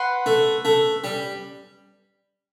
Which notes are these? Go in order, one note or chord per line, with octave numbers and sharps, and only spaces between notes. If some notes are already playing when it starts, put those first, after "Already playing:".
Already playing: B4 F#5 C6
A3
A3
G3